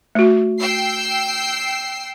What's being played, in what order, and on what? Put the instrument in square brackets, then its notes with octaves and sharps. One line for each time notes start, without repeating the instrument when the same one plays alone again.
[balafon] A3 F#4
[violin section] G5 E6 C7